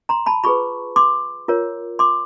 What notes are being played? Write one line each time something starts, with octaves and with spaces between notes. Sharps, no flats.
A#5 C6
A5 B5
F4 G#4 B4 B5 C#6
C6 D6
F4 A#4 C#5
C6 D6